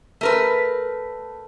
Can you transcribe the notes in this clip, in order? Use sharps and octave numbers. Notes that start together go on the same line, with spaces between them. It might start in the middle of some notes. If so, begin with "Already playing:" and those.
A3 A#4 B4